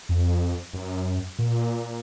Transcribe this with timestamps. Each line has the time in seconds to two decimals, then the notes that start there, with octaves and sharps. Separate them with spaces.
0.09 F2
0.73 F#2
1.39 A#2